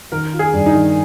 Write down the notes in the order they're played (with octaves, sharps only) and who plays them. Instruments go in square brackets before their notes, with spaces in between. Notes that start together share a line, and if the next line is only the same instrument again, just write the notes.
[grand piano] D#3 [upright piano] A#4
[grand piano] F4
[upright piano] G#4
[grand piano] G2
[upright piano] D#4
[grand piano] D#3